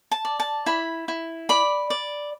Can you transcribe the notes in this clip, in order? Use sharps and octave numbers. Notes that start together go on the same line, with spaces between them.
A5
D5
A5
E4 B5
E4
D5 B5
D5